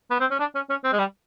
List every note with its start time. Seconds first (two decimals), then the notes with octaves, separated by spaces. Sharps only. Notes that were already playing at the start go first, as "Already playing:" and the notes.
0.10 B3
0.20 C4
0.31 C#4
0.40 D4
0.55 C#4
0.70 C#4
0.84 C4
0.93 G#3
0.99 G3